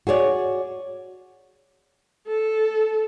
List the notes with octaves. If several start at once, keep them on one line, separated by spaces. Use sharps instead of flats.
F#4 G#4 C#5 D5
A4